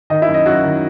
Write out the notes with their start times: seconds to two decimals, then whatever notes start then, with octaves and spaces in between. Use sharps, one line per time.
0.10 D#3 D#4 D#5
0.22 E4 E5
0.28 F#2
0.34 D#4 D#5
0.46 F#2 F#3 F#4
0.64 D#3